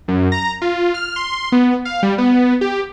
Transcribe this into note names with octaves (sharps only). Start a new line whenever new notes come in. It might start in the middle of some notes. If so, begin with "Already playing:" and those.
F#2
A#5
F4
F6
C6
B3
F5
G3
B3
G4